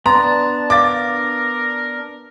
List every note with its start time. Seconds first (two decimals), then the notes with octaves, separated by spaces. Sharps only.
0.06 B3 D4 A5 A#5 C6
0.70 A#4 D5 F5 D6 A6